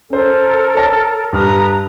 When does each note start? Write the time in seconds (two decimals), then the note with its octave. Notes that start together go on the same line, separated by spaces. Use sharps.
0.10 C#4 A4 A#4 C5
0.75 C#5 A5 A#6
1.33 G2 B4 A#5 D#6 F6